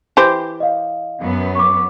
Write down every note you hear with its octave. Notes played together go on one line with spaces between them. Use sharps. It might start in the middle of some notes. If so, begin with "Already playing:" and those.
E3 G4 C5
D#5 F5
F#2 B3
C#6 D6